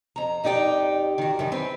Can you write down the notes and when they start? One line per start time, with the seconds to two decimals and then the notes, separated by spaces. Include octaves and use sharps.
0.16 F2 A#5
0.44 F2 D#4 G4 D5 G5
1.18 D#3 F#4
1.39 F#2 D#3
1.52 C4 B4